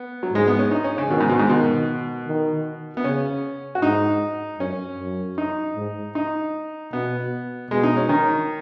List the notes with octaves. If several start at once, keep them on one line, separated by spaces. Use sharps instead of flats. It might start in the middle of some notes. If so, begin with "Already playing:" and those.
Already playing: B3
F#3
G#2 G#3
B3
C#4
D#4
C#4
C#3
B2 D#3
G#2
B2
G#2
B2 D#3
D#3
B3
C#3 C#4
F#4
G#2 D#4
F#2 C#4
F#2
D#4
G#2
D#4
B2 B3
B2 G#3
D#4
C#4
D#3